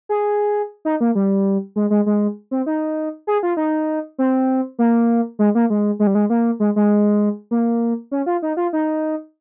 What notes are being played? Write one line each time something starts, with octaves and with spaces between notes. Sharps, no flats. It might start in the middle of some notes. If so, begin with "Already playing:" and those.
G#4
D#4
A#3
G3
G#3
G#3
G#3
C4
D#4
G#4
F4
D#4
C4
A#3
G#3
A#3
G#3
G#3
G3
G#3
A#3
G#3
G#3
A#3
C#4
F4
D#4
F4
D#4